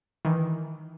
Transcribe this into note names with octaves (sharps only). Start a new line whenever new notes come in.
D#3 E3